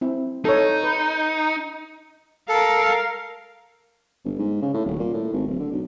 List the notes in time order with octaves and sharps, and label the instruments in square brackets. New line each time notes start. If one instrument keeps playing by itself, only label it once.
[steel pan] C4 E4
[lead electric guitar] D#4 [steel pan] A4 C#5
[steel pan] B4
[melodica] A4 [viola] A#4 F5
[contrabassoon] G1
G#2
C#3
A2
D#1
A#2
A2
G#1
D1
D3
B1